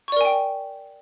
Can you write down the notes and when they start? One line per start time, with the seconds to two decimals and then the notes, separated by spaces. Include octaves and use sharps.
0.08 C#6
0.12 D5
0.16 A#4
0.21 G#5
0.25 G5